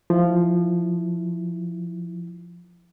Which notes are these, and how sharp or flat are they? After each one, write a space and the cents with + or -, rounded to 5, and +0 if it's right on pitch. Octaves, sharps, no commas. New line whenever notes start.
F3 +0 E4 +0